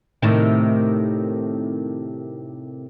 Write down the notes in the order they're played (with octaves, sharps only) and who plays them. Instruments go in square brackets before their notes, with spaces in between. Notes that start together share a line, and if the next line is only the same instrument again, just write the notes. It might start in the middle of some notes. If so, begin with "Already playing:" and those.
[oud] A2 C3 D#3